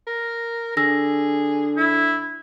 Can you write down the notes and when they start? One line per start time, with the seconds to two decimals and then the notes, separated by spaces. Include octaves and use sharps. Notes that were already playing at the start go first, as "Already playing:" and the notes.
0.07 A#4
0.77 D3 G#4 E6 A#6
1.77 E4